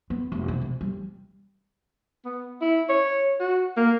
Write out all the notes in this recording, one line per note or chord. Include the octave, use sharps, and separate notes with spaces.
B3
F1
C3
C3
G3
B3
E4
C#5
F#4
A#3